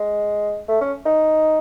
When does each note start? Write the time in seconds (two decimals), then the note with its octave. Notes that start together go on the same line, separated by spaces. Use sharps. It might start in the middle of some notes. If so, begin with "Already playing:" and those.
Already playing: G#3
0.68 A3
0.81 C#4
1.06 D#4